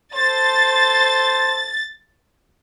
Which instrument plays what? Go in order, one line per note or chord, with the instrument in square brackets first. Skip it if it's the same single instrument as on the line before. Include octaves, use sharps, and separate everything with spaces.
[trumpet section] A4 C5 [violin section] A6